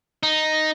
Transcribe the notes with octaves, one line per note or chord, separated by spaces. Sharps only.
D#4